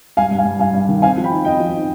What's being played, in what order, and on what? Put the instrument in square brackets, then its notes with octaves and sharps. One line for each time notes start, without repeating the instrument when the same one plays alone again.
[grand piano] G2 F5 G#5
G2
F5 G#5
G2
G2 F5 G#5
G2
D#3
C4 F5 G#5
F3
G5 B5
D#4
C4 D#5 G5
F3
D#4